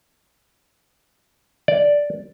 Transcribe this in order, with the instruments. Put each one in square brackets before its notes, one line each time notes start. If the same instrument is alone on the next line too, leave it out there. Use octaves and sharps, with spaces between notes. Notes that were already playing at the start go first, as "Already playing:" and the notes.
[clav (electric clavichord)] D5